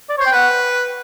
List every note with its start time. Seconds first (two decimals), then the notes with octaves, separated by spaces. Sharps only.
0.09 D5
0.18 C5 C#5
0.26 G5
0.32 B4 F#5